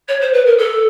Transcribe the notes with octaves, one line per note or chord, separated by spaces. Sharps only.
C#5
C5
B4
A#4
A4